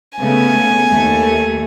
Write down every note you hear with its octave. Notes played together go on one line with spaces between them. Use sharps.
C#3 A3 B3 G#5
D#2 A3